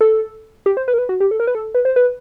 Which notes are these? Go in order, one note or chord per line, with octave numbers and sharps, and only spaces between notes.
A4
G4
C5
B4
A#4
B4
F#4
G4
A4
A#4
B4
A4
B4
C5
B4